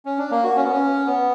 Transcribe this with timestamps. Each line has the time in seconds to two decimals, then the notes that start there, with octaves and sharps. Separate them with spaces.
0.05 C#4
0.18 D4
0.31 A#3
0.44 F#4
0.56 C#4
0.64 B3
0.71 C#4
1.06 B3